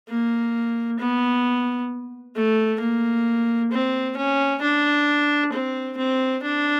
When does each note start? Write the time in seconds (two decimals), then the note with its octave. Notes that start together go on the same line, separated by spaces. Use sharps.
0.09 A#3
0.99 B3
2.36 A3
2.80 A#3
3.72 C4
4.17 C#4
4.62 D4
5.52 C4
5.97 C4
6.42 D4